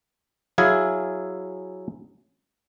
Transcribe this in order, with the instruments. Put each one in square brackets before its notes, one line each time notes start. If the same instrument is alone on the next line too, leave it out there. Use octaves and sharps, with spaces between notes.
[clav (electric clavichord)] F#3 E4 G#4 E5 F5 G#5